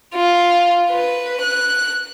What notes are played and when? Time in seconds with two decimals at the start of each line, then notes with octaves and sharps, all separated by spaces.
0.14 F4
0.91 B4
1.41 F#6